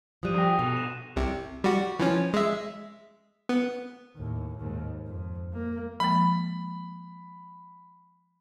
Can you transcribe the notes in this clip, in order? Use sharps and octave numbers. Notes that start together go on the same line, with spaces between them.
F3 G3 D#6 F#6 D#7
G#4 G5 D#6 A#6
B2 F#4 A4 F7
E7
C2 C3
G3 F#4
E3 F3 C#4
G#3 E5
B3
D#2 A2
D#2 G#2
F2
A#3
F3 G#3 A#3 B5